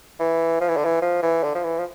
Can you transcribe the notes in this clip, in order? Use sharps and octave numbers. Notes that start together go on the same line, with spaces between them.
E3
F3
E3
D3
E3
F3
E3
D3
F3
E3
F3